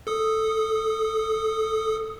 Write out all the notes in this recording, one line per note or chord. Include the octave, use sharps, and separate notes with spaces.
A4 D#6